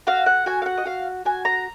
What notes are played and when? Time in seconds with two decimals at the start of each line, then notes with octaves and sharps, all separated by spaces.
0.07 F#4 F5
0.26 F#5
0.46 F#4 G#5
0.62 F5
0.66 F#5
0.77 D#5
0.85 F#4 F5
1.25 F#4 G#5
1.45 A#5